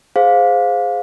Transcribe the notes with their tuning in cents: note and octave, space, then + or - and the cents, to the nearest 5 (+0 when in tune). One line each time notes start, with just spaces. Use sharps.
G#4 +0 C5 -5 F5 +15